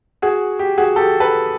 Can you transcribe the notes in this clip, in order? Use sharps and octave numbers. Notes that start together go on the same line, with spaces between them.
F#4 G#4
G4
F#4 G#4
G4 A4
A4 B4